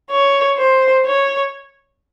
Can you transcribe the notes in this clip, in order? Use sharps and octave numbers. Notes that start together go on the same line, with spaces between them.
C#5
C5
C#5